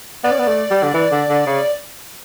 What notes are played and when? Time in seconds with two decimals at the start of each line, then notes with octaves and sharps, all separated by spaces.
0.24 B3 D5
0.31 C#4
0.39 B3
0.47 A3
0.71 G3
0.83 D3
0.94 E3
1.12 D3
1.29 D3
1.47 C#3